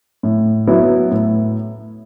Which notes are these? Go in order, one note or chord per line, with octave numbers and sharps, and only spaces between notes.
A2
F#3 B3 E4
A2